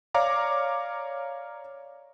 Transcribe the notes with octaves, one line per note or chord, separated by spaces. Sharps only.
C#5 D5 F5 A#5 D6